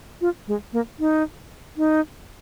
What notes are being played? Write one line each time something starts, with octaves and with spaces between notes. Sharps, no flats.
F4
G#3
A#3
D#4
D#4